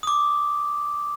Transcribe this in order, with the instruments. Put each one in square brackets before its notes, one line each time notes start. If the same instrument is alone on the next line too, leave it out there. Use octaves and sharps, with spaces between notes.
[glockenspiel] D6 D#6